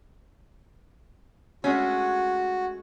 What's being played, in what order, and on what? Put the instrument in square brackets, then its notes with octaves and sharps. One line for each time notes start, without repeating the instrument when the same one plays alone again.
[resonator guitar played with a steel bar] G#3 A3 C#4 [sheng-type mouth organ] F#4